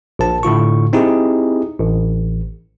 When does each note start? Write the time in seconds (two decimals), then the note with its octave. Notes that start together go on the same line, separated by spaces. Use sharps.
0.19 A#1 A5
0.43 A2 D3 F4 C#6
0.93 C4 D#4 E4 G4 G#4
1.79 A1